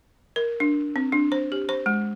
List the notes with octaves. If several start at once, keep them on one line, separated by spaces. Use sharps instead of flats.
A#4
D4
C4
D4
C5
G4
C5
G#3